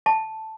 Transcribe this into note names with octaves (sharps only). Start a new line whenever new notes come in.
A5